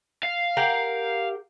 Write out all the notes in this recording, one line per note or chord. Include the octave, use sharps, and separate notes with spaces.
F5
G4 A#4 F#5